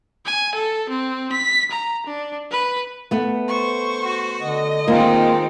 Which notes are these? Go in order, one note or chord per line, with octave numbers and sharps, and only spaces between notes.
G#5
A4
C4
B6
A#5
D4
B4
A3 B3
C5 C#6
F#4
D3 D#5
D#3 G#3 A#3 C4 F4